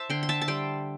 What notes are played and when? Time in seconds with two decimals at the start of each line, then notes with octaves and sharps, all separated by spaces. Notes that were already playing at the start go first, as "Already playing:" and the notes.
Already playing: C5 E5 A5
0.10 D3 G5 C6
0.23 C6
0.29 E5 A5
0.41 A5
0.48 G3 G5 C6